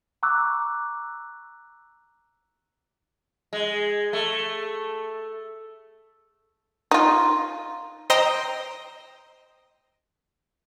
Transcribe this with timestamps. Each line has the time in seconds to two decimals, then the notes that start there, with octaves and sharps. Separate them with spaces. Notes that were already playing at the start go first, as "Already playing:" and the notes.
0.23 A#5 C#6 D6 E6 F#6
3.53 G#3
4.13 A3
6.91 D#4 F4
8.10 C5 D#5 G5 A#5 D#6